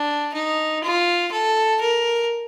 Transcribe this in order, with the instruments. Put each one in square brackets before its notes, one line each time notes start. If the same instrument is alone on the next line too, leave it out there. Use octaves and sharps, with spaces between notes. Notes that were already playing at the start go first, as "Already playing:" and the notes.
Already playing: [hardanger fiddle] D4
D#4
F4
A4
A#4